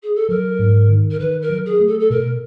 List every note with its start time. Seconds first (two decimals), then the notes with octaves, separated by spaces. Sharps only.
0.02 G#4
0.15 A4
0.29 F#3 A#4
0.59 G#2
0.89 D#3
1.10 A#4
1.19 D#3 B4
1.41 A#4
1.49 F#3
1.65 G#4
1.80 A3
1.87 A4
1.99 A4
2.10 B2 A#4